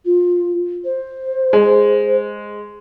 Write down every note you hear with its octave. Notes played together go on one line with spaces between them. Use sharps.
F4
C5
G#3